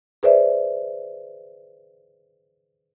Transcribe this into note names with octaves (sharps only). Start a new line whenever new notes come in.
G#4 B4 C5 D5 E5